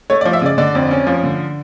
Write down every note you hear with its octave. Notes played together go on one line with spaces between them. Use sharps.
A3 C#5
D5
F3
E5
C#3 D5
D3 D5
F2
C#4
F3
D3